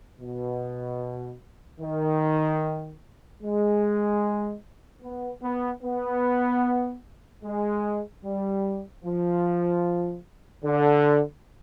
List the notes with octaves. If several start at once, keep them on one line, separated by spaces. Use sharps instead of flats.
B2
D#3
G#3
B3
B3
B3
G#3
G3
F3
D3